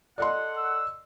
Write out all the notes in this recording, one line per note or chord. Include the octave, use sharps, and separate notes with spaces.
A4 D5 D#5 F#5 C6
E6